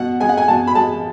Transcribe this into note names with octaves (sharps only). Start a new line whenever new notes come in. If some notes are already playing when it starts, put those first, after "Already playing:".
Already playing: B2 F#5
G#3 G#5
F#5
G#5
B2 A5
B5
G#3 A5